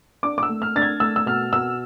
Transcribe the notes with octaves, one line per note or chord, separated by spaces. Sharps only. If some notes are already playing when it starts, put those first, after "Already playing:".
D4 D6
D6
E6
A3
F6
D4 A6
G#6
A3 E6
E6
B2 F6
B2 E6